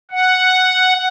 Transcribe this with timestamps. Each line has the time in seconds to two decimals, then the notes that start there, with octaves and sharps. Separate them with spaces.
0.11 F#5